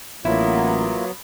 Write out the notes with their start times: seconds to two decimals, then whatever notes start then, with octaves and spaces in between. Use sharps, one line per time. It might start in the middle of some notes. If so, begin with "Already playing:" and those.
0.25 A1 F#3 A#3 B3 E4 F4